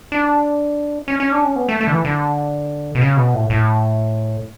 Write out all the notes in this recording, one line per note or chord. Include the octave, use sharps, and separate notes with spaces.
D4
C#4
C#4
D4
C#4
B3
A3
A3
D3
E3
D3
B2
C#3
B2
A2
A2